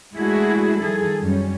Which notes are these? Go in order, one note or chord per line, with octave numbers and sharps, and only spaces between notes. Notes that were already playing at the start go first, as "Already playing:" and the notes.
G#3 A3 D4 E4 F#4 G#4
D#3 F3 G3 G#4 A4
F#2 G3 C#4